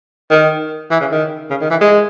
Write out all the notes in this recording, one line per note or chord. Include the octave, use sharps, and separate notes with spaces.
D#3
E3
C#3
D#3
C#3
D#3
E3
G#3